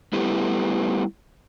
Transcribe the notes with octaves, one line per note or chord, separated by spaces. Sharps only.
G3 A3 B3 E4 G4